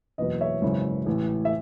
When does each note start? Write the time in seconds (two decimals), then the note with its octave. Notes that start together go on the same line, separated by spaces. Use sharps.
0.18 F#1 E2 B2 B4 D#5
0.41 C#5 E5
0.62 G#1 F#2 C#3 E3
1.06 A1 A2 E3
1.45 E5